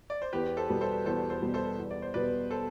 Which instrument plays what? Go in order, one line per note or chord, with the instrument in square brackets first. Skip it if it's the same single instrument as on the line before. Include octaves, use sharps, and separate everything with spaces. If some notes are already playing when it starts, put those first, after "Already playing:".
[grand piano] D5
C5
[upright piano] E2 [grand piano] G4 B4
[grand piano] A4 C5
[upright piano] B2 G3 B3
[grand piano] A4 C5
[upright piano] E2 [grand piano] A4 C5
[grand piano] A4 C5
[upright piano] B2 G3 B3
[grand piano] A4 C5
[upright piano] E2
[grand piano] D5
C5
[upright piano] B2 G3 B3 [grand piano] B4 D5
[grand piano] A4 C5